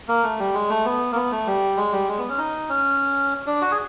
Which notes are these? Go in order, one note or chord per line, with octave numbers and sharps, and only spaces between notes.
A#3
A3
G3
G#3
A3
B3
A#3
B3
A3
G3
G#3
G3
G#3
B3
C#4
D#4
C#4
D4
F#4
G#4